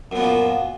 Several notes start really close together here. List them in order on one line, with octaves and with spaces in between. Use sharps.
F#2 B3 A#2 F3